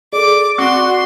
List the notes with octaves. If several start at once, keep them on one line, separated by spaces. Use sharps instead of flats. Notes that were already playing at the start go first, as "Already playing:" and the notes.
G#4 A4 D5 D6
C4 F#4 C6